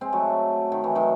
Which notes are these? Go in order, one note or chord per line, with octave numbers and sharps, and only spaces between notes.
G#3 C4
F#3 A3
D#3
E3
D#3 F#3